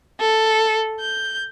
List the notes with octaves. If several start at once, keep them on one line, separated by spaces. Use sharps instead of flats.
A4
G6